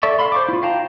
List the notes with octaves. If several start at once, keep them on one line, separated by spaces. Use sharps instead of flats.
A4 D5 E5 C#6
A4 F5 B5 C6
C5 C#6 D6
E4 F4
F5 G5 A5 A#5